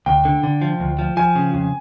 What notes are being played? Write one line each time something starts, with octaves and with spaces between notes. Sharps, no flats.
D2 G5
D3
D3
F3
D2
F3
F3 G#5
C#3
F2